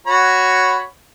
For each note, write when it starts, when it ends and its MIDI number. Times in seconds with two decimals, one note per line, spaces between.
0.07 0.85 66
0.07 0.85 73
0.07 0.85 83